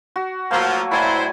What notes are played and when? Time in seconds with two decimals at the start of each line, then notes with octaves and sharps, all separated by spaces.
0.16 F#4
0.51 F3 F#3 A3 A#3
0.92 A2 E4 C5 D5 G#5